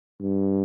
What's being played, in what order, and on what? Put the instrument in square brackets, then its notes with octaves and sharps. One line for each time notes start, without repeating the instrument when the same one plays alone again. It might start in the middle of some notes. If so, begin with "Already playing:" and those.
[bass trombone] G2